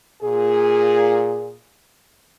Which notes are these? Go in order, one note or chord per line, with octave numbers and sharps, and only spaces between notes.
A#2 G#4